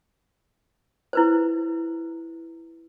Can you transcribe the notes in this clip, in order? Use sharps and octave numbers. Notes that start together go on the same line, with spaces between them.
E4 B4 C5